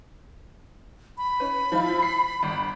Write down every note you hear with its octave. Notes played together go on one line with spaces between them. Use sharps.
B5
C#4 B4
F3 E4 F4
C7
G1